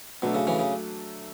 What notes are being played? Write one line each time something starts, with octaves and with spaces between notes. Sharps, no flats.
B2 F#3 A3 D4 A4
C#3
C#3 E3
C#3